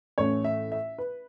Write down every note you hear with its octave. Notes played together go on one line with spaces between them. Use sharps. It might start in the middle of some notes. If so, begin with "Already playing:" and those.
A1 A2 A3 C#4 C#5
E5
E5
B4